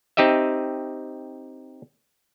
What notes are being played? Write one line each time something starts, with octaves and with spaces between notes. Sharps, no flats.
C4 D#4 G4 D#5 E5